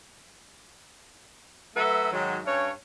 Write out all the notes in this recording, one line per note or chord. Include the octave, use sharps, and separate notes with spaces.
F#3 A3 A4 B4 E5
G#2 D#3 F#3
G2 C#4 C#5